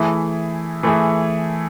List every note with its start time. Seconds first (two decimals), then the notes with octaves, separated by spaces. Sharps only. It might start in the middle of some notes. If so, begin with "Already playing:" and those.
Already playing: E3 A3 E4 G#4
0.83 E3 A3 E4 G#4